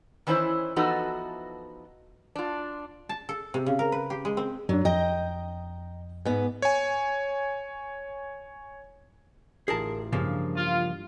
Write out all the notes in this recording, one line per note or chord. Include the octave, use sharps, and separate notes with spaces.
D#3 E3 C#4 E4 C5
E3 F3 B3 D#4 F#4 A4
D4 F4
A5
A4
C3
C#3
A#4
B4
G4
G#3
C4
F#2 F#3 D4
F2 D#5 G5 A#5
G#2 B3
C#5 G#5
A1 F4 G#4 A#4 A5
G2 C#3 F3 A#3
F4